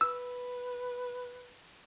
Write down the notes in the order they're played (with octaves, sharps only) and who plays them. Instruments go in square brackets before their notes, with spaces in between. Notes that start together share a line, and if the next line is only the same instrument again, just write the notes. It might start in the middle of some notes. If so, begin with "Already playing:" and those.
[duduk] B4 [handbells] E6